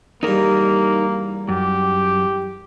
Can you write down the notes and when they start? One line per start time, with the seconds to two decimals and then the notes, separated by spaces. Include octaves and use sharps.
0.23 E2 G2 A#3 D#4 A#4
1.49 F#2 G4